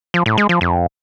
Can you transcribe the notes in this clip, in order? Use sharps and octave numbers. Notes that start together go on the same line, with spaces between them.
F3
A2
G#3
F3
F2